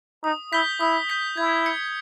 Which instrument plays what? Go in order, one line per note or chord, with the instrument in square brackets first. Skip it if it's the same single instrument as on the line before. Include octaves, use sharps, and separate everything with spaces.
[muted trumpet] D#4 [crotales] D#6
[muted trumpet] E4 [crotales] G6 B6 G7
[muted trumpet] E4 [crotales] D#6
[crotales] G6 B6 G7
[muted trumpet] E4 [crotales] G#6
[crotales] C#7 G7